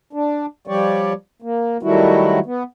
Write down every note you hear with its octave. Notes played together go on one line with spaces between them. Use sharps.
D4
F3 G3 G4 C#5 D5
A#3
D#3 F#3 G3 A3 E4 F#4
B3